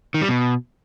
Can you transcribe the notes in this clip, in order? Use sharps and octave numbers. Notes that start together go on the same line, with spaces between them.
D#3
G3
B2